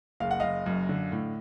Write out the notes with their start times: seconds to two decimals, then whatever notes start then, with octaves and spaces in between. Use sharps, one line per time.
0.20 F#1 F5
0.31 F#5
0.40 F#1 D#5 F5
0.66 F#2
0.89 D3
1.12 A2